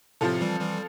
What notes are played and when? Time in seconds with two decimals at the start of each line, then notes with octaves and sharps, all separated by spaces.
0.21 A2 C3 F3 C4 F4 A4
0.41 E3 G3
0.61 E3 G3